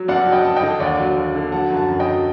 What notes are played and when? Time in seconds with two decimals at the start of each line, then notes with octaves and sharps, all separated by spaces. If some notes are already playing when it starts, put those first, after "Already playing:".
Already playing: F#3
0.08 G2 D5 F#5
0.26 F#3
0.33 D#5 G5
0.45 G2 A5
0.56 D#5 G5
0.62 D3
0.80 D#2 D5 F#5
0.98 F#3
1.16 D#2
1.35 D3
1.52 F#3 F#5 A5
1.70 F#2
1.76 F#5 A5
1.88 F#2
2.00 D#5 G5
2.06 F#3